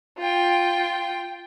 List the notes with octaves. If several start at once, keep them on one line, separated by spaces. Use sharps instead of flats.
F4 G5